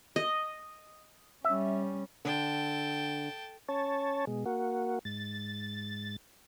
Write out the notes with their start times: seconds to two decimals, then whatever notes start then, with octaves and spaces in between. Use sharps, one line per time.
0.16 D#5
1.45 G3 C#4 E5
2.25 D3 G5 A5
3.68 C#4 C#5 A5
4.27 B2 G#3
4.46 A#3 F#4
5.05 G#2 A6